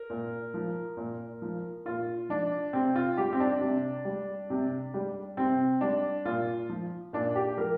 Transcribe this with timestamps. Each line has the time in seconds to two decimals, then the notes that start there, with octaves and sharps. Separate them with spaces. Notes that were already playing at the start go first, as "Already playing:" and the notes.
Already playing: A#4
0.10 A#2
0.54 F3
0.97 A#2
1.42 F3
1.85 A#2 F4
2.29 F3 D4
2.73 C3 C4
2.96 F4
3.17 G3 G4
3.33 C4
3.40 D4
3.61 C3
4.05 G3
4.50 C3
4.94 G3
5.37 C3 C4
5.81 G3 D4
6.25 A#2 F4
6.70 F3
7.13 A#2 D4
7.35 G4
7.58 F3 A#4